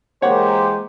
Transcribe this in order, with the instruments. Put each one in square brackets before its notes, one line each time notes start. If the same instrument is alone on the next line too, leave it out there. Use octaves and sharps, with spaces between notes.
[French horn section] E3 G#3 A#3 [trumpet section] G4 C5 [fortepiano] C#5 F#5